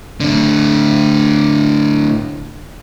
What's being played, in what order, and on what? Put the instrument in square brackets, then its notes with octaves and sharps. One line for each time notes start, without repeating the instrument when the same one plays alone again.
[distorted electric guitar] A2 D3